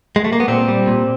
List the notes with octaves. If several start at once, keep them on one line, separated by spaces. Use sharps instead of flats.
G#3
A3
A#3
B3
A#2 C4
G3
A#2